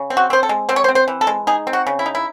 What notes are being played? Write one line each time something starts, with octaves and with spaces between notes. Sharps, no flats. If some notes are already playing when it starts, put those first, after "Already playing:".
Already playing: C#3
C4
F#4
C4 C5
A4
G#3
C4 C5
C#5
C5
C4
C5
E3
A4
G#3
D#4 G#4
C4
F#4
C#3
E4
D#4
E4